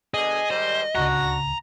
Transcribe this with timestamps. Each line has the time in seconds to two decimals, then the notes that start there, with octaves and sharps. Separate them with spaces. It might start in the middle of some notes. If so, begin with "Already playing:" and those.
0.14 B2 D3 G#4 D#5
0.50 G#2 D#3 G3 C5
0.95 D1 C#2 C#3 D4 F#4 A#5